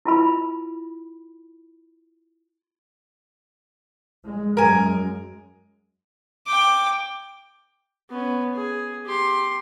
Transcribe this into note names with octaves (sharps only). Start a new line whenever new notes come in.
E4 F4 B5
G#3
F#2 G#3 A#4 G#5
G5 D6
B3 C#4
G#4
G4 C6